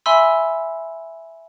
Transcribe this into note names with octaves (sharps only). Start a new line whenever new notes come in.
E5 G#5 B5 C6 E6